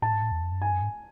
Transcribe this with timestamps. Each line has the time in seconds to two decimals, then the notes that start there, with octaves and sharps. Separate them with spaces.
0.02 A2 A5
0.13 G#2
0.22 A2
0.32 E2
0.42 F2
0.52 F#2
0.62 G2 G#5
0.72 F#2
0.82 G#2